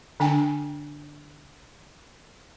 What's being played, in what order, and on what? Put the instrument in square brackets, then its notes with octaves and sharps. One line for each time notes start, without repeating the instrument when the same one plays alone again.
[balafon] D3 D4 G5 G#5